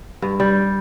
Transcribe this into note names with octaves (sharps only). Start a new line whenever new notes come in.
G2
G3